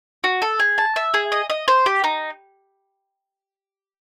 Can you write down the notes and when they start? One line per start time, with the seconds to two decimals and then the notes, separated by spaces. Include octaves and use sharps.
0.24 F#4
0.42 A4
0.60 G#4
0.78 A5
0.96 E5
1.14 G#4
1.32 D#5
1.50 D#5
1.68 C5
1.86 G4
2.04 D#4